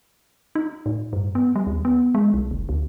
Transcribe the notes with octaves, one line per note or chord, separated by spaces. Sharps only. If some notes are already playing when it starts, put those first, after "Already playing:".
D#4
A2
G2
B3
G3
D#2
B3
G#3
B1
F1
D2